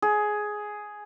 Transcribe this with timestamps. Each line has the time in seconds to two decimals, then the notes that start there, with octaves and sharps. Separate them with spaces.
0.02 G#4